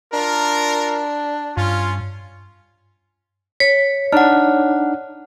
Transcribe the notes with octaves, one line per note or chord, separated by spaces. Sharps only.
D4 F4 A#4
G2 C#4 F4
C#5 B6
D4 D#4 F#5 F6